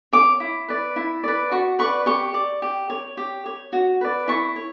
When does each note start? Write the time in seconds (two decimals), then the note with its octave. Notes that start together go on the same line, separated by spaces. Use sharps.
0.13 C#5 D6
0.40 E4
0.68 B4 D5
0.96 E4
1.24 B4 D5
1.51 F#4 C#6
1.79 B4 D5 C#6
2.06 G4 C#6
2.34 D5
2.62 G4
2.90 C#5
3.17 G4
3.46 C#5
3.73 F#4
4.01 B4 D5
4.28 E4 C#6
4.56 C#5